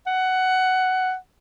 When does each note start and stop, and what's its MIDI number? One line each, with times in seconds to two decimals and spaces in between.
0.07 1.15 78